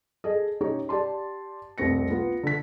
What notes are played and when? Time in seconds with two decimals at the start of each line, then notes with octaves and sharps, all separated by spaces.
0.24 G#4 A4 D#5
0.61 C#4 D#4 G4 C#5
0.89 G4 D5 A5 C6
1.78 F1 C2 G3 C4 A#6 C#7
2.10 B3 F4
2.43 D3 B6